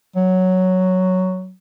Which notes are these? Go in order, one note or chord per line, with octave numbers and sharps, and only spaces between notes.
F#3